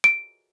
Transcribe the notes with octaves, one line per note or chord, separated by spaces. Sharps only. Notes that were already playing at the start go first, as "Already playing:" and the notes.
D7